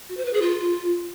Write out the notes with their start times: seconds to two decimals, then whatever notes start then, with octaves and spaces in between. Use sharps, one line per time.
0.09 F#4
0.17 C5
0.25 B4
0.33 G#4
0.42 F4